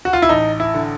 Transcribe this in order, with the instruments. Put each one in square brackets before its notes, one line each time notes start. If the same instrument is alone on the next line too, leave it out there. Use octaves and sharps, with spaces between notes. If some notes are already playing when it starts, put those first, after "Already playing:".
[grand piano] F#4
F4
E4
A1 D#4
E4
D3